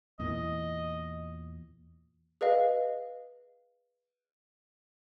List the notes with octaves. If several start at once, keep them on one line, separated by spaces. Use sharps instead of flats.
E2 A#2 E3 D#5
G#4 B4 D#5 F5